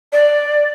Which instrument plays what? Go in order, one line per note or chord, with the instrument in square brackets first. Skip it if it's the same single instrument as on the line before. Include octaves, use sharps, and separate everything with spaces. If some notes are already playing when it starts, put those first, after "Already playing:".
[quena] D5